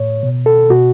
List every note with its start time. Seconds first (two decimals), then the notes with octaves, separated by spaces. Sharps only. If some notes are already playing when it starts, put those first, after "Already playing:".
Already playing: A2 C#5
0.23 B2
0.46 A4
0.70 B2 F#4